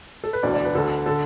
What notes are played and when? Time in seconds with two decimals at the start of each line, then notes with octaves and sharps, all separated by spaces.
0.24 A4
0.33 B4
0.43 E1 D2 D3 D5
0.54 D5
0.64 B4
0.75 D2 D3 A4
1.06 D3 A4